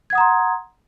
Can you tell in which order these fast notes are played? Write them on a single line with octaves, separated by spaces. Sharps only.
G#6 F#5 D#6 A#5 C6